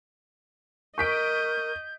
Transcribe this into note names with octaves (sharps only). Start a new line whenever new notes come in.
A#4 D#5 C#6 G6 B6 D7